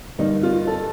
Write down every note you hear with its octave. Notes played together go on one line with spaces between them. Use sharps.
G2 D3 G3 A#3 D#4
F4
A4